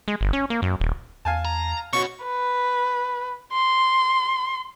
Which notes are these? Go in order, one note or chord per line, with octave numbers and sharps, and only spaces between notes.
G#3
G1
C#4
A#3
F#2
D#1
E2 F5 G#5 A5
A#5
B2 C#4 F#4 C#6
B4
C6